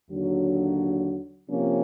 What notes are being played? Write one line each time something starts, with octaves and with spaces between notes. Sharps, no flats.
D#2 D3 F#3
C3 F3 A#3 C#4